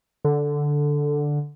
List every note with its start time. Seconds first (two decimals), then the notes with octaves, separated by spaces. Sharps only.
0.24 D3